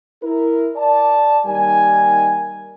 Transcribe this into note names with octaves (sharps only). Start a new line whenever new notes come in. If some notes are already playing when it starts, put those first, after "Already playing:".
E4 A#4
D5 A5
D#2 G3 D#4 A#4 G#5